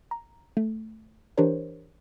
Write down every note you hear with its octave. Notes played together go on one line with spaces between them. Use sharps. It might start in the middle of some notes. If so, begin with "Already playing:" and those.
A#5
A3
E3 D4 G4 A#4 C5 C#5